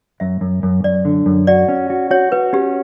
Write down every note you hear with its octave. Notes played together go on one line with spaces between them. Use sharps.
F#2 E5
F#2
F#2
F#2 D5
D3
F#2
F#4 D5
C#4
F#4
F#4 C#5
F#4 B4
C#4 G4